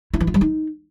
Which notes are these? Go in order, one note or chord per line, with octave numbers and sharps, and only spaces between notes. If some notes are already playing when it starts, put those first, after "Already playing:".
E4
E3
F4
G3
D#4